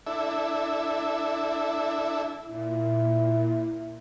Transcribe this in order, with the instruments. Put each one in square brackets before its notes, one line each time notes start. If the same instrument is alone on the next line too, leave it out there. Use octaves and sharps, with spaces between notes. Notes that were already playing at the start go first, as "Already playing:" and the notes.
[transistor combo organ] D4 E4 A4 E5
[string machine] A#2 [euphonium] E4